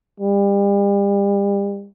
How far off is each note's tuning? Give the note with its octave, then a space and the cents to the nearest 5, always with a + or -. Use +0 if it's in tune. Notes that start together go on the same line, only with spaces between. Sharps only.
G3 +35